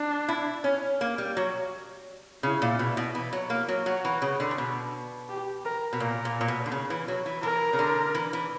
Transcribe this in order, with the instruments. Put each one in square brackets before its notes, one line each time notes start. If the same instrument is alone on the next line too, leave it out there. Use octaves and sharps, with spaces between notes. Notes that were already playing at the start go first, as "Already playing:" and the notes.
Already playing: [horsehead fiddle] D4
[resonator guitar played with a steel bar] E4
C#4
A#3
G3
F#3
[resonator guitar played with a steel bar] C#3 [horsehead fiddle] E4
[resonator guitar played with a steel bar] A#2
B2
B2
E3
F#3
A#3
F#3
[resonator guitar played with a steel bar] F#3 [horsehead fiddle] F#4
[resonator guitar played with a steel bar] E3
C#3
D3
C#3
B2
[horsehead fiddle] G4
A#4
[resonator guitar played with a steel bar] B2
[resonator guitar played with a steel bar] A#2 [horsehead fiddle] A#4
[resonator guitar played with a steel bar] A#2
A#2
B2
D3
C#3
E3
F#3
E3
[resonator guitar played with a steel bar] E3 [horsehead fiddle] A#4
[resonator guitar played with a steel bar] C#3
D3
E3
E3